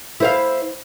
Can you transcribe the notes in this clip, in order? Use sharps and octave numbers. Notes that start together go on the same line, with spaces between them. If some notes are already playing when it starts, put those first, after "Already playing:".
E4 C5 F5